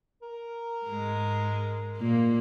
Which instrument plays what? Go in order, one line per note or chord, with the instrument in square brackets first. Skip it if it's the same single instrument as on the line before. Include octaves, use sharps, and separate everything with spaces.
[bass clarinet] A#4
[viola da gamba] G#2 G#3
A#2 A#3